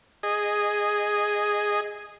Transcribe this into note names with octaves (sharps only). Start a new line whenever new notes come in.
G#4 D#5